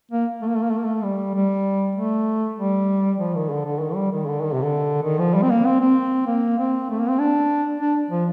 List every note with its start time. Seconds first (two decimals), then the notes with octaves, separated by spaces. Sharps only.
0.11 A#3
0.42 A3
0.48 A#3
0.56 A3
0.63 A#3
0.71 A3
0.78 A#3
0.85 A3
1.03 G3
1.35 G3
1.95 A3
2.57 G3
3.18 F3
3.35 D#3
3.50 D3
3.65 D3
3.81 D#3
3.95 G3
4.12 D#3
4.27 D3
4.43 D#3
4.53 C3
4.62 D3
5.03 D#3
5.19 F3
5.34 G3
5.42 C4
5.50 A#3
5.65 C4
5.80 C4
6.26 A#3
6.58 C4
6.90 A3
7.00 A#3
7.09 C4
7.19 D4
7.80 D4
8.11 F3